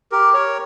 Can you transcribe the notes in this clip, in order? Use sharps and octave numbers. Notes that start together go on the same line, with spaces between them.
G4 A#4
A#4 C#5